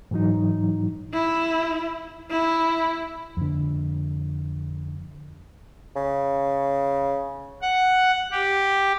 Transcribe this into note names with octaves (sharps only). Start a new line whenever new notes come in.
G#2 E3 F#3 D#4
E4
E4
F2 D3
C#3
F#5
G4